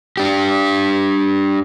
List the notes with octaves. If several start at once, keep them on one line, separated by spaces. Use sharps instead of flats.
D4 G4